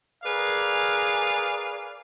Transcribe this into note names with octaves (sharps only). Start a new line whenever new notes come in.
G#4 A#4 B4 D5 F5